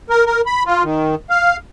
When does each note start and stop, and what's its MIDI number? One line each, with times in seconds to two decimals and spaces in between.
0.09 0.26 70
0.26 0.41 70
0.46 0.63 83
0.66 0.83 65
0.84 1.15 51
1.30 1.57 77